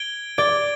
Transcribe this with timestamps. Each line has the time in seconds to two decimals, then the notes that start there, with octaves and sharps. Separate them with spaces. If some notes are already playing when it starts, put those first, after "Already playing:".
Already playing: G#6 D7 G7
0.38 D5 G#6 D7 G7